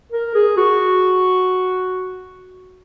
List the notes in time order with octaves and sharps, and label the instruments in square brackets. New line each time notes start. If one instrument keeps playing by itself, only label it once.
[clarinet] A#4
G#4
F#4